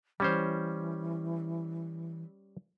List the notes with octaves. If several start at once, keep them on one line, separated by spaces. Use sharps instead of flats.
E3 G3 C#4 C5